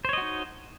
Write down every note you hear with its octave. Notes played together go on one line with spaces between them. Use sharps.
D#4 F#4 C5 C#5 D#5